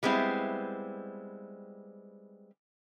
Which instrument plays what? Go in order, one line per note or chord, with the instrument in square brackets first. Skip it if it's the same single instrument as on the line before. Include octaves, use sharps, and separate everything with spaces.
[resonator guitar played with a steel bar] G3 G#3 B3 C4 E4